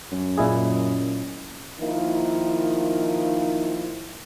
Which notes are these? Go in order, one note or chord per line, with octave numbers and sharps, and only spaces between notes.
F#2
A#2 C#4 E4 G#4 D#5
D#3 F3 A#3 D#4 E4